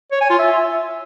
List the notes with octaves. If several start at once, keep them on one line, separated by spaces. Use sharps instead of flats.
C#5
G#5
F4
E5